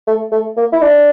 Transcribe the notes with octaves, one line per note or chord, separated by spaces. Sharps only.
A3
A3
A#3
E4
D4